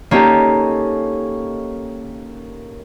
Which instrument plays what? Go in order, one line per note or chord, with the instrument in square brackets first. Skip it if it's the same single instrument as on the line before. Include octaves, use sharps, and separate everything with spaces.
[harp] A#3 C#4 D#4 G4 A4